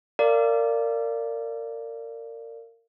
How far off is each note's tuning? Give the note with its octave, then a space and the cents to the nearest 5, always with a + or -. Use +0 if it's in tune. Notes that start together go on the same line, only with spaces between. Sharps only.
A#4 -25 D5 +0 F5 -20